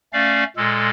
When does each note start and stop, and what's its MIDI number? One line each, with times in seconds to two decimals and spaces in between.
0.13 0.44 57
0.13 0.44 61
0.13 0.44 74
0.13 0.44 77
0.57 0.91 46
0.57 0.91 56
0.57 0.91 69